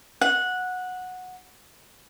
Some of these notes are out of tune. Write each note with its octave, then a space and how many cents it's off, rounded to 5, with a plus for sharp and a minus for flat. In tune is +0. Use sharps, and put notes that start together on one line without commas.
F#5 -10